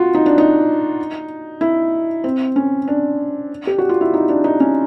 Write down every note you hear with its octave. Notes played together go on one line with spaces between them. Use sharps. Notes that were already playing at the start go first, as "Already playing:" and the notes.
Already playing: F4 F#4
D#4
D4
D#4
E4
C4
C#4
D4
G4
F#4
F4
E4
D#4
D4
D#4
C#4